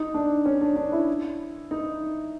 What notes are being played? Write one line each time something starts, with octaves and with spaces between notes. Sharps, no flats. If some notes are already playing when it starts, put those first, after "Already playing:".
Already playing: D#4
D4
C#4
D4
D4
E4
D#4